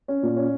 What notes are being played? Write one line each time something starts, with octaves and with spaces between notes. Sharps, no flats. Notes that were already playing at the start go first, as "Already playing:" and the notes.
C#4
A#2
C#4